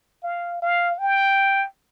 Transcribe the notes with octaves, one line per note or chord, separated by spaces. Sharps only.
F5
F5
G5